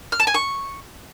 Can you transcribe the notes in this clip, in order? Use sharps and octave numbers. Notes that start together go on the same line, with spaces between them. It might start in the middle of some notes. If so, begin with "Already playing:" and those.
F6
A5
G#5
C#6